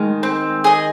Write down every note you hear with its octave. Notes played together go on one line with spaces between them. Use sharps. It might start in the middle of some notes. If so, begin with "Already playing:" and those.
Already playing: D#3 G#3
C4
G#4 D#5